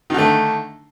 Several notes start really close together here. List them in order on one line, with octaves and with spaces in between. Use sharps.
D#3 D3 A3